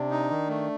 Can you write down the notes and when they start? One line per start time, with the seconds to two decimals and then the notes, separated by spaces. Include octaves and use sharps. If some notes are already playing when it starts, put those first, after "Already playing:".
Already playing: C3 D4
0.11 D#4
0.30 D#3
0.48 A3